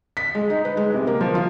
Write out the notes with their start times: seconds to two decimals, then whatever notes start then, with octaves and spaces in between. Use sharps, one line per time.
0.17 B6
0.35 G#3
0.50 D#4
0.65 B4
0.77 G#3
0.94 C3
1.07 A#3
1.21 F3
1.35 F4